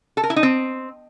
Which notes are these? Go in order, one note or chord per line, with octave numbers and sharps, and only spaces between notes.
A4
A#4
E4
D#4
C4